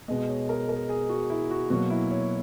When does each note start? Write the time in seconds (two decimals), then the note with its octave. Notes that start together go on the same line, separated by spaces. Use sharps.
0.08 B2 G#3 B3 D#5
0.28 C#5
0.49 A#4
0.69 A#4
0.89 G#4
1.09 F#4
1.30 E4
1.51 F#4
1.70 B2 F#3 A#3 F#4
1.90 E4
2.11 C#5